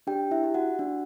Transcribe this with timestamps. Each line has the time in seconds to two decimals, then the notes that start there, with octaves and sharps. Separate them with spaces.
0.07 D4 G4 G5
0.31 E4 E5
0.44 G4
0.54 F#4 F#5
0.79 D4